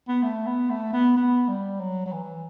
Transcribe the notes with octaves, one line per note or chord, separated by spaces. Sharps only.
B3
A3
B3
A3
B3
B3
G3
F#3
F#3
E3